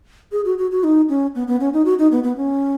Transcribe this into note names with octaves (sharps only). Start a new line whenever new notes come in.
G#4
F#4
F#4
F#4
D#4
C#4
B3
B3
C#4
D#4
F#4
D#4
B3
B3
C#4